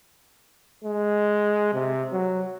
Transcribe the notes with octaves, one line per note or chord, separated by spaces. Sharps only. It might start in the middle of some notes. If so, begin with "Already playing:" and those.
G#3
C3
F#3